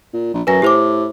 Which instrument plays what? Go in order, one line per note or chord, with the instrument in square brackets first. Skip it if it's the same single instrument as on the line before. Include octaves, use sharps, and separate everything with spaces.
[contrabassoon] A#2
A#1
[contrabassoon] F#2 [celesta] B4 G#5 A#6
[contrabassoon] A2 [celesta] G4 C5 D6